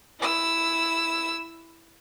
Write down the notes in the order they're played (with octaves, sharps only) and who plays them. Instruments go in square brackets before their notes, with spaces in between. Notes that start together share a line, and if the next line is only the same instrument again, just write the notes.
[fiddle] E4 E6